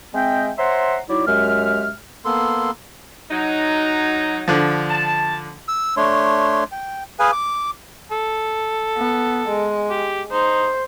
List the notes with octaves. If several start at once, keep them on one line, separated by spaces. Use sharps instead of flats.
G#3 C4 D#5 E5 G5
C5 C#5 E5 F#5 A#5 C6
F#3 D#4 E4 D5
F#2 G#3 G4 E5 F6
A#3 B3 A4 C6
F#3 D#4
D3 F3
A5
E6
A3 D4 C#5 C6
G5
G#4 B4 F5 G#5
D6
A4
B3
G#3
G4
D#4 C5